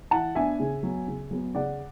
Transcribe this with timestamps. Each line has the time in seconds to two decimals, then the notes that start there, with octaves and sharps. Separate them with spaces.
0.11 E3 F#5 A5
0.35 B3 D4 E5 G#5
0.60 C#3
0.83 F#3 B3
1.08 C#3
1.31 F#3 B3
1.55 C#3 D5 F#5